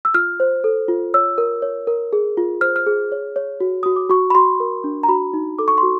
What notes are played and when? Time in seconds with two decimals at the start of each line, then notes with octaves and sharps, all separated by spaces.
0.05 E6
0.14 F4 F6
0.40 C5
0.64 A4
0.88 F4
1.14 C#5 E6
1.38 A#4
1.62 C#5
1.87 A#4
2.13 G#4
2.37 F4
2.61 C5 F6
2.76 F6
2.87 G#4
3.12 C#5
3.36 C#5
3.60 F#4
3.83 F#4 D#6
3.96 D6
4.10 F#4 C#6
4.30 B5
4.35 F#4 C6
4.60 A#4
4.84 D4
5.03 A#5
5.09 F#4 B5
5.34 D#4
5.59 A4 D6
5.68 C#6
5.78 C6
5.83 F#4